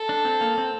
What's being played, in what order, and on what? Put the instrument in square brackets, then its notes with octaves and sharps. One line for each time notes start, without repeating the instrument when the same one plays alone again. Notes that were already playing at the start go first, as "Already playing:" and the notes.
Already playing: [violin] A4
[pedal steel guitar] D4
C4
A#3
C4